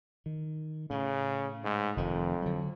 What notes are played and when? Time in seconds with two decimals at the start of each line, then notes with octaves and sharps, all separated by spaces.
0.26 D#3
0.90 A2 C#3
1.64 G#2
1.97 F1 F2 D#3
2.42 D3 F#3